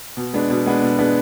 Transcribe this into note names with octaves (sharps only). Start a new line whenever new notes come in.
B2
G#3 B3 D4
B2
G#3 B3 D4
B2
G#3 B3 D4